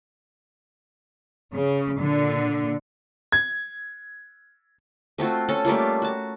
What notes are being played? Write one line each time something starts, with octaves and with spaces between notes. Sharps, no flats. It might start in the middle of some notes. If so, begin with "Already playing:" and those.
C#3
A#2 D3
G#6
A3 C4 F4 F#4
C#4 A4
G3 A3 A#3 F4
F#4 A5